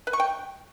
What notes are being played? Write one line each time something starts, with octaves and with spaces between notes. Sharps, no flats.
B4
C#6
G5